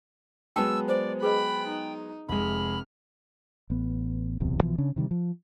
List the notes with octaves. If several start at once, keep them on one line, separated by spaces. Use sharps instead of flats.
F#3 G#3 B3 G5 A5 E6
C5 D5
G#4 B4 D#5 G5 B5 F#6
D#4
F1 C3 G#3 B5 F6
A1 B3
D1 B1 E2 C3
A#1 B2 E3 F3
C#3 C#4 D4
C3 D#3 F3 G3
F3